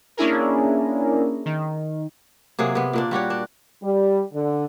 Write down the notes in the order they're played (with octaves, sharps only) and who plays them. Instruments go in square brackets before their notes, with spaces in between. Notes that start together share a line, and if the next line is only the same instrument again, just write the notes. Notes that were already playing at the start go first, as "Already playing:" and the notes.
[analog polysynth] A#3 C#4 D4 E4 G#4 A#4
D#3
[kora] C3 F#3 A#3 G#4
C3 B3
A#2 A#3 D4
G3 F#4 G4 C#5
D4
[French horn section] G3
D3